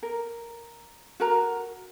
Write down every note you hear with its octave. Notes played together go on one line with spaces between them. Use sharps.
A#4
F#4 A#4 A#5